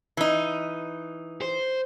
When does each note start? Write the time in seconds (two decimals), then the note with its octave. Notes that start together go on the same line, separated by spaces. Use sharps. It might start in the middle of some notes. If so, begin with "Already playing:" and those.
0.17 E3 D#4
1.42 C5